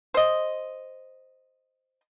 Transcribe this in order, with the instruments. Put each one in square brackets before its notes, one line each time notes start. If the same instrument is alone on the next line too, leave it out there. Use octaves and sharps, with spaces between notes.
[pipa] C5 D#5